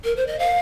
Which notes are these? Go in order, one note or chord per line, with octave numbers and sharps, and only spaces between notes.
A#4
C5
D#5
F5